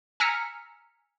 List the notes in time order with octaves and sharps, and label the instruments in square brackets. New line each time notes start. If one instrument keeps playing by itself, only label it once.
[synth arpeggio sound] G#5 A#5 E6 F6 B6 C#7